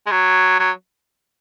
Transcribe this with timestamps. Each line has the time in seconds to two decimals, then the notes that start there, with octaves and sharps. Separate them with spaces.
0.07 G#3
0.11 F#3
0.60 F#3